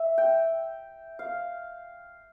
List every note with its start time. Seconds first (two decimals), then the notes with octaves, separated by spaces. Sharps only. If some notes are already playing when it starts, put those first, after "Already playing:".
Already playing: E5
0.18 G5
1.19 F5